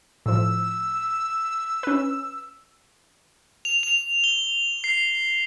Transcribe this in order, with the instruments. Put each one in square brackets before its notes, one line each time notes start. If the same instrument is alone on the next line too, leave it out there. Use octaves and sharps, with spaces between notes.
[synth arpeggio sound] A2 F3 [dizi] E6
[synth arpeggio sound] C#4 B4
[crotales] F7
F7
G7
C7